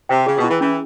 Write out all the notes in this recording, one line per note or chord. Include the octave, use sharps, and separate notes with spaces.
C3 G5
C#3 G#4
B2
E4
E3
E3 C#4